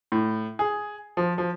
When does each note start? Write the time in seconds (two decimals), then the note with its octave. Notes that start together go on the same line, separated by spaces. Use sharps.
0.12 A2
0.59 G#4
1.17 F3
1.38 F3